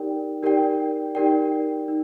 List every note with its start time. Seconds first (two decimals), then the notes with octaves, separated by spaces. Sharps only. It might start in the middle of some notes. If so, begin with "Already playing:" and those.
Already playing: D#4 G4 A#4 D5 G5
0.43 D#4 G4 A#4 D5 G5
1.15 D#4 G4 A#4 D5 G5
1.88 D#4